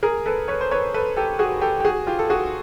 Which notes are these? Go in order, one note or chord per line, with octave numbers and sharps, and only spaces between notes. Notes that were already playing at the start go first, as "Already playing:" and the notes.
G#4 A#4
A4 B4
B4 C#5
C5
B4 C#5
A4 B4
G4 A4
F#4 G#4
G4 A4
G4
F#4 G#4
F4 G4
A4
F#4 G#4